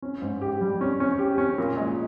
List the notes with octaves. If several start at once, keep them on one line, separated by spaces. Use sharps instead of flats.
C#4
G#2
G4
G3
C#4
C#4
G4
C#4
A#2
G#3